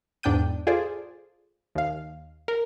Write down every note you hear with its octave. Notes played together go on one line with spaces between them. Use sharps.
E2 G#2 D4 G5 G6 D#7
F4 G#4 A4 C5 D5
D#2 F5
A#4